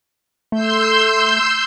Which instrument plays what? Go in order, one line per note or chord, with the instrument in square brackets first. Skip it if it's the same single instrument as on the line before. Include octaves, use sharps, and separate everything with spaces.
[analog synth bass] A3 [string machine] C6 E6 G6